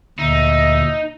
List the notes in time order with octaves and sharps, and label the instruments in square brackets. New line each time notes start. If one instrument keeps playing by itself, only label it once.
[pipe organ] D2 A#2 E5 [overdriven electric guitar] D#4